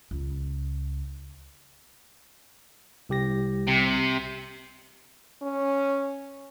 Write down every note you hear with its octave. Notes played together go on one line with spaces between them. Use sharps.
C#2
C2 G4 A#6
C3
C#4